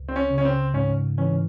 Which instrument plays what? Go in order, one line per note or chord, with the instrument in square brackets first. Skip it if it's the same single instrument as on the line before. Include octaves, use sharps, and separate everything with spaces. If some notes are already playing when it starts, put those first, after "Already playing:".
Already playing: [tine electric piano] C#2
[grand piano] C4
C#4
[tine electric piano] C#3
[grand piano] C#4
C4
[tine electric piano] G#2 [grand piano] C#4
[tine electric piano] E3 [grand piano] C#4